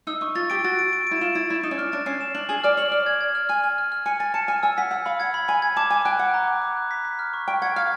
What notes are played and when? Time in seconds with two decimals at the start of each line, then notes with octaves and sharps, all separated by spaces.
0.07 D#4 E6
0.21 D#4 C#6
0.35 F4 A6
0.50 G4 D7
0.64 F#4 A6
0.79 D7
0.93 D7
1.07 E4 D7
1.21 F4 E7
1.35 E4 A6
1.49 E4 A6
1.63 D#4 E7
1.71 C#4
1.78 D4 F6
1.92 D4 A6
2.06 C#4 C7
2.21 E7
2.35 D4 F#7
2.49 G#4 F#7
2.64 D5 F6
2.77 C#5 F#7
2.91 D5 F6
3.06 G#6
3.21 G#6
3.35 F6
3.49 G#5 F6
3.64 F6
3.78 F6
3.92 F6
4.06 G#5 C#7
4.20 G#5 A6
4.34 A5 C#7
4.48 G#5 F6
4.63 G#5 E6
4.78 F#5 B6
4.91 F#5 E6
5.06 F5 B5
5.20 F#5 G#6
5.34 B5
5.48 G#5 B5
5.62 G#6
5.77 A5 D6
5.90 G#5 D6
6.05 G5 F#6
6.19 F#5 D6
6.34 A#5
6.48 D6
6.62 D6
6.76 F#6
6.91 B6
7.05 B6
7.19 F6
7.33 C#6
7.48 G5 C#6
7.62 F#5 G#6
7.76 F5 F6